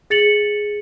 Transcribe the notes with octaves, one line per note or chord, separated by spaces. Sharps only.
G#4 A6 C#7 F7 F#7